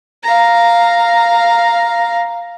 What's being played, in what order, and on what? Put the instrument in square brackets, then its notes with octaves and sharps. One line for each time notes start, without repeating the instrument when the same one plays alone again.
[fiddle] F5 A#5